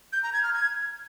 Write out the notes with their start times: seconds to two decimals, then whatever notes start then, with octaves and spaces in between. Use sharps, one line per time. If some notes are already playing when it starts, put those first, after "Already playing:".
0.13 G6
0.23 A#5
0.33 G#6
0.43 F6
0.54 G#6